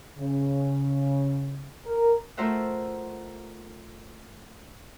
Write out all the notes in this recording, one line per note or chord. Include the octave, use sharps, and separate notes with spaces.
C#3
A#4
A3 F4 A#4 C5 E5 F#5